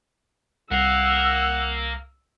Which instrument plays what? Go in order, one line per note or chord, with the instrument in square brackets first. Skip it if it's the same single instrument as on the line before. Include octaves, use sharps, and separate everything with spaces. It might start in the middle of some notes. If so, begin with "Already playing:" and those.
[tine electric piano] C2 [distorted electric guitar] A#4 F5 [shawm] F#5 [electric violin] E6